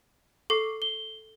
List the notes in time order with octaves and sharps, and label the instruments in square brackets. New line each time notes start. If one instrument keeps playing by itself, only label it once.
[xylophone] A4 [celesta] C#6 D6 C7
[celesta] G7